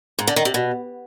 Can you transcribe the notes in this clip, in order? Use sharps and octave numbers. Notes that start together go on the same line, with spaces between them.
G#2
D3
D#3
C3
B2